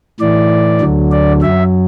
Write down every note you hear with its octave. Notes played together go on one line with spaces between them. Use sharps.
A2 E3 D5
D2 D3 F#3
D5
F#2 F#3 E5